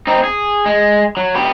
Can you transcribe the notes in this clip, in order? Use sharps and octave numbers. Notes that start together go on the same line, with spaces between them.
C4 D#4
G#4
G#3
F#3
B3 G4